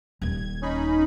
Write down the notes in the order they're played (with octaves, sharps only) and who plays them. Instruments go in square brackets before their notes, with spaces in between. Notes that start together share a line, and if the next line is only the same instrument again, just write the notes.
[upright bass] D#1 D#2 [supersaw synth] G#6
[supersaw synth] C#4 D#4 B5